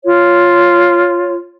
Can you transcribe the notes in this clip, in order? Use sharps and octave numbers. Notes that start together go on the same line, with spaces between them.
F4 C#5